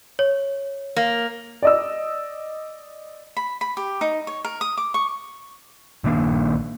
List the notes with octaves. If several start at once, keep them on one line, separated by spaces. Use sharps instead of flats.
C#5
A#3
D5 D#5 E6
B5
B5
G4
D#4
C#5
A#4
D#6
D6
C#6
A#1 D#3 A#3 D4